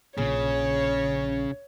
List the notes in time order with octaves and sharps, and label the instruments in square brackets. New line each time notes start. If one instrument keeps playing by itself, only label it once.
[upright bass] A#1 [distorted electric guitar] C#3 [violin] C#5